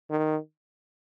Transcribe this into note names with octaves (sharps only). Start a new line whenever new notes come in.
D#3